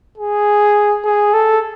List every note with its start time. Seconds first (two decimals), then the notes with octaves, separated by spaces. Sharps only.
0.18 G#4
1.05 G#4
1.34 A4